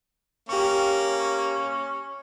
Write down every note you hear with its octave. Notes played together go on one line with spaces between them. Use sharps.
A#3 C#4 G4 C#6